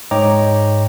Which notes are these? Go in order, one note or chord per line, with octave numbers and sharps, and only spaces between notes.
G#2 C#5 D#5 G5 A#5 D6